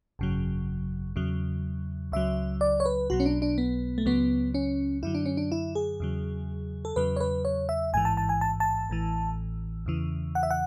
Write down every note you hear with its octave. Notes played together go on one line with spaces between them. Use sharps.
G#1 F#2 C#3 F#3
E2 C#3 F#3
C#2 C#3 F#3 E5
D5
C#5
B4
B1 B2 F#3 F#4
C#4
D4
D4
B3
A3
C#2 C#3 F#3 B3
C#4
F#2 D3 F#3 E4
D4
C#4
D4
E4
G#4
E2 C#3 F#3
A4
E2 C#3 F#3 B4
C#5
B4
C#5
E5
A1 G#2 E3 G#5
A5
A5
G#5
A5
A5
A1 A2 E3
E2 C#3 E3
F#5
E5
F#5